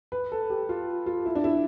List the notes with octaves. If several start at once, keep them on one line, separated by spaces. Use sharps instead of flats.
B4
A4
G4
F4
F4
E4
D4
E4